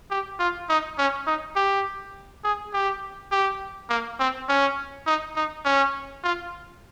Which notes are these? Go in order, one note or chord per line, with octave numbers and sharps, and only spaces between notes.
G4
F4
D#4
C#4
D#4
G4
G#4
G4
G4
A#3
C4
C#4
D#4
D#4
C#4
F4